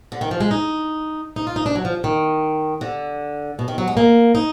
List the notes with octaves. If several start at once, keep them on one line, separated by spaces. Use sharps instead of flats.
D3
D#3
F3
G#3
D#4
D#4
F4
D#4
D4
F#3
F3
D#3
D3
B2
D#3
F#3
G#3
A#3
D#4